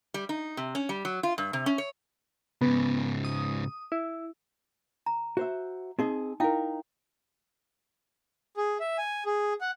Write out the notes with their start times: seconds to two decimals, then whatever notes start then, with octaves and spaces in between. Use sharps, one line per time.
0.14 G3
0.29 D#4
0.57 C3
0.75 C#4
0.89 G3
1.05 F#3
1.23 F4
1.38 G2
1.53 C3
1.66 C#4
1.78 C#5
2.61 G#2 C#3 B3
3.24 D#6
3.92 E4
5.06 A#5
5.37 F#4 C5 E5
5.99 C4 D#4 G#4 D#5
6.40 D#4 E4 A#4 F5 G5
8.57 G#4
8.80 E5
8.98 G#5
9.26 G#4
9.61 F#5